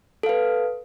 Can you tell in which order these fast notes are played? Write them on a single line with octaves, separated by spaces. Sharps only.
A4 F5 B4